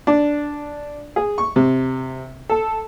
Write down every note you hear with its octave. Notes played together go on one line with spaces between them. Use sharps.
D4
G#4
C#6
C3
A4